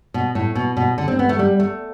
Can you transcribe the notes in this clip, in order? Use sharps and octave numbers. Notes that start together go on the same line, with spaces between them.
B2
A2
B2
B2
D3
C4
B3
A3
G3
A3